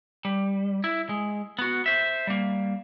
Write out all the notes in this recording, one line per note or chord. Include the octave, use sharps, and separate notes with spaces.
G3
E4
G#3
B3 F#4
C5 E5
G3 A#3